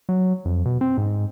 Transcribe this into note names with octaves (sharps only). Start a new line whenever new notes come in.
F#3
F2
B2
C4
G#2